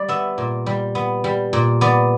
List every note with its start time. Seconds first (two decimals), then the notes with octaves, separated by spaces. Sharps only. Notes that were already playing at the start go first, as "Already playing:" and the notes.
Already playing: G3 D5
0.08 B3 E5
0.38 A#2
0.66 G3
0.95 B3
1.24 G3
1.53 A#2
1.81 B3 D5